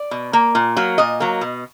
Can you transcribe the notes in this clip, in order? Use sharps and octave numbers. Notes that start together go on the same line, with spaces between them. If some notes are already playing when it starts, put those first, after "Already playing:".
Already playing: D5
B2
A#3
A#2
F#3 A#3
A#2 D#5
F#3 A#3
B2